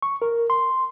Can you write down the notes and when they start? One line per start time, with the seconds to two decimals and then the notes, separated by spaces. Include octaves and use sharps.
0.02 C#6
0.22 A#4
0.50 C6